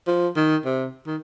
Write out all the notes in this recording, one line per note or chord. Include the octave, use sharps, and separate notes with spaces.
F3
D#3
C3
D#3